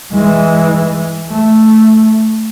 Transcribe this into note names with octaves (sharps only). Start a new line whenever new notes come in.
E3 G#3
A3